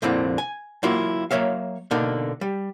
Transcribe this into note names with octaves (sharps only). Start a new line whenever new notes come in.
C2 F2 A#2 D3 C4 E4
G#5
F#3 A#3 E4 F4 F5
F#3 A#3 C#5 E5 F5
B2 D3 A#3 D4 D#4
G3